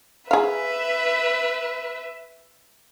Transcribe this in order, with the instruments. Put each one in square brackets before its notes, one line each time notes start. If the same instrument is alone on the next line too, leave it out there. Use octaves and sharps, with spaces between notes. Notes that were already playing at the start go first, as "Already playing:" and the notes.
[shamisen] G#4 F5 [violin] B4 E5